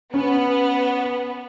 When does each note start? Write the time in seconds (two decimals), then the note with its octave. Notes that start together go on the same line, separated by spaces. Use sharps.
0.14 B3 C#4